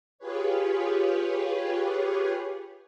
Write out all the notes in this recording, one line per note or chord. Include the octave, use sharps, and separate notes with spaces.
F4 G4 G#4 B4 C#5